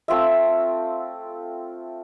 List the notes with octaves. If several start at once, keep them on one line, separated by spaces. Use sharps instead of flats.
A3 C4 F4 E5